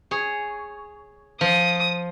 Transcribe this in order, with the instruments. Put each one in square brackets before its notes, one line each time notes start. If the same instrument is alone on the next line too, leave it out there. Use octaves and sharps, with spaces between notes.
[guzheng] G#4 C#5
[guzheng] F3 [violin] D#6